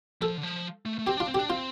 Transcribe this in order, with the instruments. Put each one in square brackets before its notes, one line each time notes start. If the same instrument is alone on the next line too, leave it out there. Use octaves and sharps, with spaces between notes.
[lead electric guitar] F3 [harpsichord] A4
[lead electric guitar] D3
F3
A3
A3
[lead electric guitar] C4 [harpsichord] G4
[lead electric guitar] D4 [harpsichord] F4
[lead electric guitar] C4
[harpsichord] G4
[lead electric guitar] D4
[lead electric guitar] C4 [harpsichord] F4